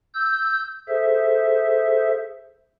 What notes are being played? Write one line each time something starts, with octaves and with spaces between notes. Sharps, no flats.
E6 G6
G#4 A4 C5 E5